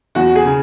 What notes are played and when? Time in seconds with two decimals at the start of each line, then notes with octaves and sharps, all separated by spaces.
0.15 E2 F#4
0.35 G#4
0.45 C#3